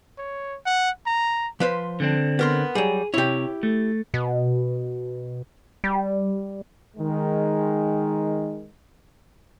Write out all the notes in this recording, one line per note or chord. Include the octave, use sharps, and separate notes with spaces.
C#5
F#5
A#5
F3 B4 C5
D3 C4 D4
B3 A#4 C6
F#3 G3 G#4
C3 E4 G4 C#5
A3
B2
G3
D#3 G#3